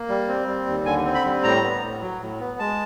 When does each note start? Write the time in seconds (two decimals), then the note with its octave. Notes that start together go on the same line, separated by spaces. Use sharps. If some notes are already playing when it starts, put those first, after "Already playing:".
Already playing: A#3
0.09 G3
0.28 C4
0.47 G3
0.67 D#2
0.85 D3 G#5
1.05 C4
1.15 B5
1.25 G3
1.43 A2 A#5
1.63 B3
1.82 A2
2.02 F#3
2.21 A2
2.40 B3
2.59 G#3 A5